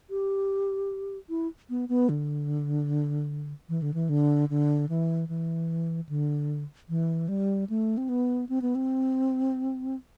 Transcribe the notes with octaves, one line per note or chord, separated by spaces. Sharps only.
G4
E4
B3
B3
D3
E3
D3
E3
D3
D3
E3
E3
D3
E3
G3
A3
C4
B3
C4
B3
C4